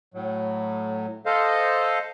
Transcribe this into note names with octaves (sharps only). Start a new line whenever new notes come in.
A2 F#3
A4 C5 D#5 F5